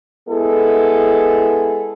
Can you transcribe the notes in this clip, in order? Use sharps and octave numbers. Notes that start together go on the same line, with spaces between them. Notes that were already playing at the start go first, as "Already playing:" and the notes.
G#3 B3 E4 G#4 A4